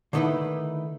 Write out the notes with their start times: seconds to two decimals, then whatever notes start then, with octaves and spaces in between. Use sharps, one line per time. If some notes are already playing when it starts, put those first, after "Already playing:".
0.13 D3 D#3 A3 D#4 E4 B4